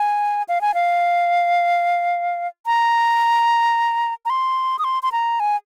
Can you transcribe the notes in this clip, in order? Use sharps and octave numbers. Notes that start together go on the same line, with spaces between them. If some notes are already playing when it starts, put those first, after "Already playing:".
Already playing: G#5
F5
G#5
F5
A#5
A#5
C6
D#6
C6
C6
A#5
G#5